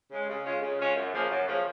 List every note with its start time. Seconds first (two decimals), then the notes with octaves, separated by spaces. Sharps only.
0.10 C#3 G#3
0.28 C#3
0.45 G#3 C#4 F4
0.61 C#3
0.78 G#3 C#4 F4
0.95 F#2
1.12 C#3 F3 A#3 C#4
1.29 F#2
1.46 C#3 F3 A#3 C#4